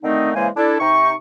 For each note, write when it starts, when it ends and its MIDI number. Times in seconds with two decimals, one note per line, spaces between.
0.03 0.33 50
0.03 0.33 51
0.03 0.33 57
0.03 0.33 60
0.03 0.33 63
0.35 0.49 49
0.35 0.49 52
0.35 0.49 56
0.35 0.49 58
0.35 0.49 72
0.35 0.49 80
0.56 0.78 62
0.56 0.78 64
0.56 0.78 69
0.80 1.13 48
0.80 1.13 63
0.80 1.13 85